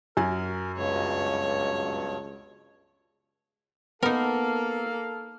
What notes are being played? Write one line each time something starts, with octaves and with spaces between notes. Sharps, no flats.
F#2 A#4 G#5
C#2 G2 B2 C#5
A#3 B3 D#4 A4 A#4 F5